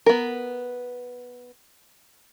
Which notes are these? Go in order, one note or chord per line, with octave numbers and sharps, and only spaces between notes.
B3 A#4